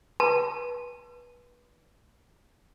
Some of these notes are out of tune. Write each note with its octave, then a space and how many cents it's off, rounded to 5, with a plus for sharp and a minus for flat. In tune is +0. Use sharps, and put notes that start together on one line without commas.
B4 -25 A5 +0